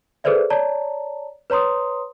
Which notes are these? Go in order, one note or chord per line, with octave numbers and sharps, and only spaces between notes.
G#4 A4 B4 C5 D5 E5
C#5 D5 A5 A#5
B4 C#5 A#5 C6 D#6